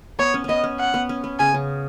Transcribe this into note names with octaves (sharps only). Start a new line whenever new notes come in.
B3 C#5
C#4
B3 C#4 D#5
C#4
F#5
B3
C#4
B3
C#3 G#5
C#3